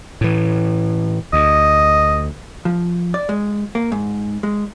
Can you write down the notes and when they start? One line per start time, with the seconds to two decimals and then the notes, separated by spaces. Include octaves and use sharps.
0.21 A2 E3
1.33 D2 D#5
2.65 F3
3.14 D5
3.29 G#3
3.75 A#3
3.92 G#2
4.43 G#3